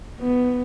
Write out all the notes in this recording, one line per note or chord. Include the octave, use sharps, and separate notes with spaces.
B3